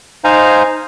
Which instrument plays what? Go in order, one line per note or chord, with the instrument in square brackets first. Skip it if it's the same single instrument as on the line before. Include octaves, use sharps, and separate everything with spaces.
[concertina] D#4 C5 F5 G#5 A#5